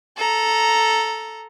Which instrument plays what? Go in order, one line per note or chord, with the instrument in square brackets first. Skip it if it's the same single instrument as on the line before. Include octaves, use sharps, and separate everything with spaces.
[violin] A4 A#5